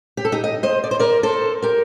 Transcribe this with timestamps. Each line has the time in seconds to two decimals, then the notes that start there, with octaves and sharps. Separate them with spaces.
0.17 G4
0.25 A4
0.32 D#4 G4
0.44 D#5
0.63 C5 D#5
0.84 D5
0.91 C5
0.99 A#4 D5
1.23 A4 C5
1.62 G4 A#4